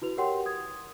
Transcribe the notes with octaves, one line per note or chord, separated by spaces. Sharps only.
E4 F#4 B4 F7
G4 A#4 C#5 F#5 G5 C6
D#6 G#6